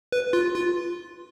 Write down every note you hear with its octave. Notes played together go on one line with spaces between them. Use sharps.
B4
F4
F4